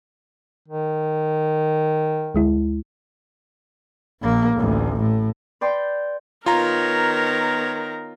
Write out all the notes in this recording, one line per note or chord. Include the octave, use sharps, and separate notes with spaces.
D#3
D2 G#3 E4
A#1 A#3
A1 D2
A2
B4 D5 G5 C6
D#3 B3 F4 A#4 C#5 A#5